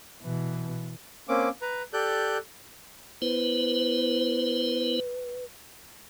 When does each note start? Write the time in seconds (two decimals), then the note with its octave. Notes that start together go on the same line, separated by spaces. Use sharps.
0.22 B2 E3
1.29 A#3 C4 C#4 D6
1.62 B4 A#5
1.93 G4 A4 D5 F#6 G6
3.22 B3 E4 B4 C5